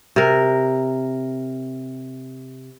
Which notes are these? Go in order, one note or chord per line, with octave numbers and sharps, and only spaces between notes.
C3 A#4